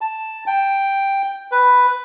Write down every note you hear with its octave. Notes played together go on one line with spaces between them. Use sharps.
A5
G5
B4